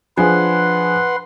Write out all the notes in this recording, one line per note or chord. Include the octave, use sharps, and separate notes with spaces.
F3 D4 G#4 B4 F#5 G#5 C6